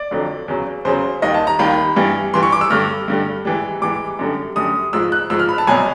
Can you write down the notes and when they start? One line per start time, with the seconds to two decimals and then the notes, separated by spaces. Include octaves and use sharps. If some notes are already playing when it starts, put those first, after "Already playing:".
Already playing: D5
0.11 F2 D3 F#3
0.48 E2 C#3 F#3
0.85 E2 C#3 F#3 C5
1.22 D#2 D#3 G3 D#5
1.34 A5
1.47 A#5
1.59 D#2 D#3 G3 B5
1.96 G2 E3 G3
2.33 G2 E3 G3 C6
2.43 C#6
2.52 D6
2.61 E6
2.70 G2 D3 G3 F6
3.08 G2 D3 G3
3.45 G#2 E3 G3
3.81 G#2 E3 G3 D6
4.19 F#2 D3 G3
4.56 F#2 D3 G3 D#6
4.93 G#2 F3 E6
5.12 F#6
5.30 G#2 F3 E6
5.39 F6
5.49 B5
5.58 A5
5.67 C2 B2 F#3 G#5